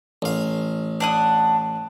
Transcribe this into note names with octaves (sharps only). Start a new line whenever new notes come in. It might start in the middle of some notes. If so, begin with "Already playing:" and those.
A1 F5
D4 F#5 D#6